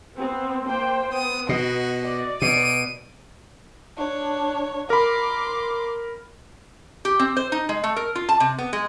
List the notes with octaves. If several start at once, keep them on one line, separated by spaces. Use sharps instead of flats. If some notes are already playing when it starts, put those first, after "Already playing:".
B3 C4
A#3 C5 G5
B3 D#6
B2 F#4 D#5
D5
B2 D7 D#7
D4 C#5
A#4 B5 C6 D6
G4
C4
C5
D#4
G#3
A3
A#4
F4
A5
C3
B3
G#3